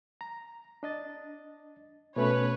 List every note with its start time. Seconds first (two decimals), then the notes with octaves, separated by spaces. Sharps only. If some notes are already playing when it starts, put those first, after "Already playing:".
0.21 A#5
0.83 D4 D#5 A6
2.16 B2 A3 C#4 B4 C#5